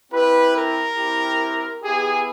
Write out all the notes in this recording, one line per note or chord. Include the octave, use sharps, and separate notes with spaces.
C4 E4 G4 B4
A#4
C4 E4 G4
B3 E4 G4 G#4